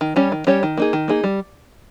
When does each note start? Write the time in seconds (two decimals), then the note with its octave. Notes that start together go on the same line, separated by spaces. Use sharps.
0.01 D#3
0.16 G3 C#4 G4 C#5
0.32 D#3
0.47 G3 C#4 G4 C#5
0.63 D#3
0.77 A#3 D#4 G#4
0.93 D#3
1.08 A#3 D#4 G#4
1.24 G3